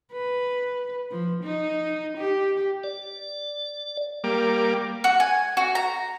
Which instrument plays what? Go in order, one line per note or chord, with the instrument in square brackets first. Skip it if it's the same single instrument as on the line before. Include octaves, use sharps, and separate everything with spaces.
[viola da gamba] B4
F3
D#4
G4
[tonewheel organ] D5
[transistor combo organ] G3 A#3 D6
[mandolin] F#4
G#5
F#4
A#5